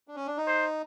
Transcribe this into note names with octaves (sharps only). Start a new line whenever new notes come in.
D4
C#4
D4
D#4
C5